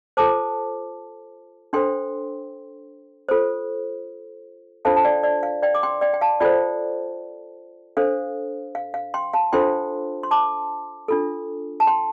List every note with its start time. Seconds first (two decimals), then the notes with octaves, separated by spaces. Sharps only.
0.17 F4 A4 C5 A5 D6
1.73 D4 A4 C5 G5 C6
3.29 F4 A4 C5
4.85 D4 F4 A4 C5 F5 A5
4.96 A5
5.05 D5 G5
5.24 D5
5.43 F5
5.63 D5 G5
5.75 D6
5.83 G5 C6
6.01 D5 G5
6.14 G5
6.21 F5 A5
6.40 F4 A4 C5 D5 G5
7.97 D4 A4 C5 F5
8.75 F5
8.94 F5
9.14 G5 C6
9.33 F5 A5
9.53 D4 F4 A4 C5 G5 C6
10.23 C6
10.31 A5 D6
11.08 D4 F4 A4
11.80 A5
11.87 G5 C6